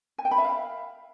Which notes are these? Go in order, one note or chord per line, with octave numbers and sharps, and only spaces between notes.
G#5
G5
B5
E5
F5